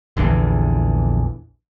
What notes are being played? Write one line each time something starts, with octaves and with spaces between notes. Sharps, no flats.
A#1 E2 D3 E3